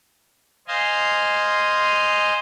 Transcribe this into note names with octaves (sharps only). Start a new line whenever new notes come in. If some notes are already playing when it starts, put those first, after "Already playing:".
C5 D#5 F5 G#5 C6